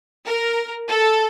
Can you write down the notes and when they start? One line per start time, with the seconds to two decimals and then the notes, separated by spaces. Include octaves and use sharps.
0.25 A#4
0.88 A4